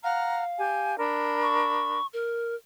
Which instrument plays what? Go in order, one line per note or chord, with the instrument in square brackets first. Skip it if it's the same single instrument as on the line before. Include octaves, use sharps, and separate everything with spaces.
[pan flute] F5 [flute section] F#5 A#5 F6
[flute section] G4 G#5
D4 A#4 B5
[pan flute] C#6
A#4